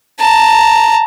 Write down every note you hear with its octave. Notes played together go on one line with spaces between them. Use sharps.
A5 A#5